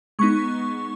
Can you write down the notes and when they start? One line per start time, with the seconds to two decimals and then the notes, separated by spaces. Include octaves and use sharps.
0.19 G#3 B3 D#4 C#6